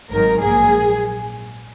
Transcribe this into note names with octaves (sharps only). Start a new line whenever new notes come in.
G#1 G#2 D#3 F#3 A#4
A#1 G#2 F#3 A#3 G#4